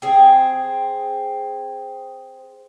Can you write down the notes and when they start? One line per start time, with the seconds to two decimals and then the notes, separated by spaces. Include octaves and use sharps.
0.02 C4 G#4